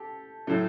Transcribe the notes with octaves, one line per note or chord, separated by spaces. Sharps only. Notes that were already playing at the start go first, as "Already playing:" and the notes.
Already playing: G4 A4
A2 F#3 A3